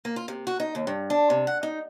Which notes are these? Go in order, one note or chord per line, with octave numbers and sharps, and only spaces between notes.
A#3
F4
C3
F#4
D#4
D#2
G2
D4
C3
F#5
D#4